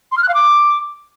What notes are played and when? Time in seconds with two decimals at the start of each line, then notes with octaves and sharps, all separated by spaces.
0.12 C6
0.17 F6
0.23 F#6
0.29 F5
0.34 D6